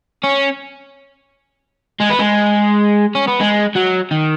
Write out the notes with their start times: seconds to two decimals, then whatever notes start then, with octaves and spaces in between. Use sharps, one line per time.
0.24 C#4
2.00 G#3
2.10 B3
2.19 G#3
3.15 C#4
3.28 B3
3.41 G#3
3.76 F#3
4.11 D#3